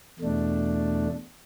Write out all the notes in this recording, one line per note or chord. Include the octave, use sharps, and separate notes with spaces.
E2 B2 A3 D4